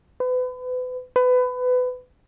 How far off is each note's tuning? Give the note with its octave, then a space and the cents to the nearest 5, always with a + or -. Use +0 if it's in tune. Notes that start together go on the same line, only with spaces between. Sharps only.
B4 +35
B4 +25